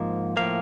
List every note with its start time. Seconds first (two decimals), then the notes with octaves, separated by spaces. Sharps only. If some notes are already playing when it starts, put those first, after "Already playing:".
Already playing: G#2 F3 A#3
0.37 A2 F3 A#3 F5